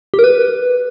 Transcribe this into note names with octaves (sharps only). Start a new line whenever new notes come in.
G4
A#4
B4